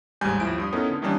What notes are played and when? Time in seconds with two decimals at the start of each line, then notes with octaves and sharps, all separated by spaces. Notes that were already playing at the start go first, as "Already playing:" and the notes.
0.21 A1 D#2 G#2 G3 G#5 G6
0.40 D#2 F3 E4 D7
0.58 G2 D#6
0.72 B3 C#4 D#4 E4 A4 A#4
0.90 D3
1.02 D#3 E3 G3 A#3 C#4 D4